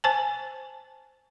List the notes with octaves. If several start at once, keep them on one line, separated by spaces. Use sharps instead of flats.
C5 G#5 A5